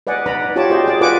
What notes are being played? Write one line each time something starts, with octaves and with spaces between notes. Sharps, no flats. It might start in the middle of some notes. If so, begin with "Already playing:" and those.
B4 D5 D#5 F#5 G#5
D#4 B4 D5 A#5 B5
F4 G4 C#5 D5 A5 D6
F#4 G#4 C5 D#5 G5
G#4 D5
F4 A#4 B4 F#5 G#5 D6